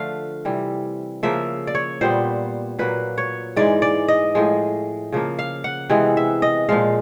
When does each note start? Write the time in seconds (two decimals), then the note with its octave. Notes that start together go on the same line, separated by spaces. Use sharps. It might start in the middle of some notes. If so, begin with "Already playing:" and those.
Already playing: D3 F3 A3 F5
0.45 C3 E3 G3
1.23 C#3 F3 A#3 E5
1.67 D5
1.75 C#5
2.01 A#2 G3 B3 C5
2.79 A#2 F#3 A#3 B4
3.18 C#5
3.56 G#2 E3 G#3 D5
3.82 D5
4.08 D#5
4.35 A2 F3 G#3
5.12 C#3 F3 A#3
5.39 F5
5.64 F#5
5.90 C3 E3 G#3 B3
6.17 E5
6.42 D#5
6.69 A#2 F3 G#3 F5